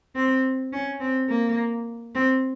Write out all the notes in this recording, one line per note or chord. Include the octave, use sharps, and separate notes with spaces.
C4
C#4
C4
A#3
C4